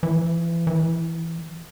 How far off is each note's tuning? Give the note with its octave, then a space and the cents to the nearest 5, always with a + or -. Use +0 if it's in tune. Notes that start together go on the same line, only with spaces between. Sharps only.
E3 +30
E3 +5